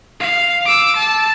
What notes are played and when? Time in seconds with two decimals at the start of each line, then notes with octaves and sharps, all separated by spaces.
0.20 F5
0.65 D6 E6
0.96 A5